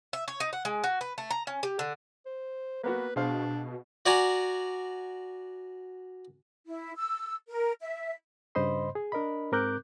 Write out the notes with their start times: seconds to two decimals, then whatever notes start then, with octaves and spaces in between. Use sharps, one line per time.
0.13 E5
0.28 C#5
0.40 D#4
0.53 F#5
0.65 G#3
0.84 F#4
1.01 B4
1.18 A3
1.31 A#5
1.47 C#4
1.63 G4
1.79 D3
2.26 C5
2.83 A#3 B3 F#4 B4
3.16 B2 D4 G#4 C5 F5
4.06 F#4 D5 G#5 A#5
6.67 E4
6.96 E6
7.50 A#4
7.81 E5
8.55 G2 C#3 C5 D#5 B5 C6
8.95 G#4
9.12 D4 A#4 D#5 B5
9.52 G#2 C4 A#4 D6 F#6 G6